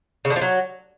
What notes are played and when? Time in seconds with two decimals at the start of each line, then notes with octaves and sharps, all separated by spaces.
0.25 C#3
0.30 D3
0.36 F3
0.42 F#3